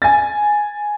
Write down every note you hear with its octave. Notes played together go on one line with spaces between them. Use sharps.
G#5 A6